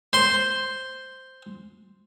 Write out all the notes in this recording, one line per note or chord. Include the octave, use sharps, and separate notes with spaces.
C5 C6